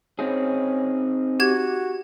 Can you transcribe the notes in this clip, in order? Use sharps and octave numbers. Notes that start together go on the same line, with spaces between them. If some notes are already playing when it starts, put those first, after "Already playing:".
C4 C#4 D#4 G#4
F#4 G4 G#6